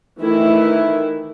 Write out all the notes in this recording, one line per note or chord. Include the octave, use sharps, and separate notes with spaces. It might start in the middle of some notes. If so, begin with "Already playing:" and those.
D#3 E3 A3 E4